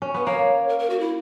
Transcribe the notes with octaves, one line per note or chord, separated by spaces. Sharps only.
C#4
B3 B4
A#3 C#5
A#4
A#4
F#4
E4